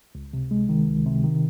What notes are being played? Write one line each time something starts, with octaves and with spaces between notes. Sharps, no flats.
C#2
C3
G#3
D#3
C#2
C3
D#3